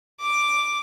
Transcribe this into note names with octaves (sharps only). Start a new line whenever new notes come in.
D6